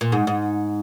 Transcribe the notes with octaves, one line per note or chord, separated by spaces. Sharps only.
A#2
G#2
G#2